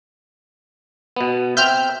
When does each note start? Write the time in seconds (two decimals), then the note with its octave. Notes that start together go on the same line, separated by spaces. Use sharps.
1.16 B2 B3
1.57 C4 E5 F6 G6